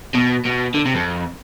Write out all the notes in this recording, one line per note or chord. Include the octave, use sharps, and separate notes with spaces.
B2
B2
D3
C3
F2